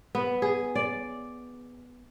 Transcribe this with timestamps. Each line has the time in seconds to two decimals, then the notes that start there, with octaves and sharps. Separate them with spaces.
0.15 B3
0.42 G#4
0.75 D5